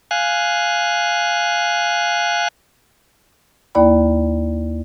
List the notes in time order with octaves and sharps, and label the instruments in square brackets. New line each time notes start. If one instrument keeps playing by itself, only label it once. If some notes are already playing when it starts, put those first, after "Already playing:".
[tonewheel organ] F5 G#5 F#6
[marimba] D#2 A#3 E4 D5 G5 B5